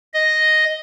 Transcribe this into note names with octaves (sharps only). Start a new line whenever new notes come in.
D#5